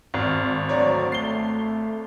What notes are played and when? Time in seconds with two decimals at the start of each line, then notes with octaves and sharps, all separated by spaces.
0.14 G#1
0.69 D2 F#3 C4 C#5 D5 A#5
1.12 A3 C7 G7